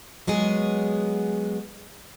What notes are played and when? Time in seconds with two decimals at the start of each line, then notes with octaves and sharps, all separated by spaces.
0.27 F#3 G#3 B3 G#4